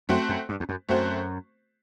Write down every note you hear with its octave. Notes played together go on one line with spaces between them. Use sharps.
F#2 A3 C4 F#4 C5
F#2
G2
E2
F#2
F#2 A3 C4 F#4 C5